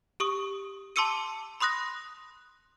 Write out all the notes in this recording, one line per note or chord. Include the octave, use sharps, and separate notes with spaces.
G4 C#6 D#6
A5 C6 D6 E6 C#7 D#7
B5 C6 D#6 F#6 A#6